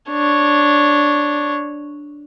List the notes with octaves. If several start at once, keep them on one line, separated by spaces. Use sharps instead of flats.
D4 C#5